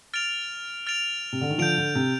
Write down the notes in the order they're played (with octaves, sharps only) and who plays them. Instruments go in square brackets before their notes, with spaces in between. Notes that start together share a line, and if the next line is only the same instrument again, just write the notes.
[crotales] F6 A6 D7 F7
F6 A6 D7 F7
[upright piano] C3
D3
D#3
[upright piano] D3 F3 [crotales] G6 D7 F7
[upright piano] D3
C3